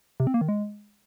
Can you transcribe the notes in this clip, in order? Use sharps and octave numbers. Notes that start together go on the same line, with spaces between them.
C3
C4
A#3
D#3
G#3